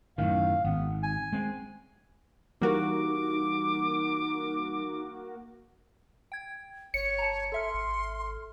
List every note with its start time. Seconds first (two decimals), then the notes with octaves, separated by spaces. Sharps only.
0.18 F#2 A2 D#3 F5
0.65 G#1 B3
1.03 G#5
1.33 G#3 C4
2.62 E3 G3 A#3 D#4 F#4 A#4 D6
6.32 G5 G#6
6.94 G1 C#5 C#7
7.19 A5 A#5
7.52 A4 E5 C6 F6
7.74 G#1